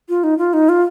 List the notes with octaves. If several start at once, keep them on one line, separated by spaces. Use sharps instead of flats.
F4
D#4
F4
D#4
F4